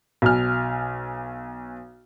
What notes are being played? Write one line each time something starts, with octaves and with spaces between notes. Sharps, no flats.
B1 G#5 F6